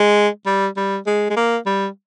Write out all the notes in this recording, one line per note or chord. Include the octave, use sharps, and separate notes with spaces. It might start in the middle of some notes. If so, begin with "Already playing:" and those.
Already playing: G#3
G3
G3
G#3
G#3
A#3
G3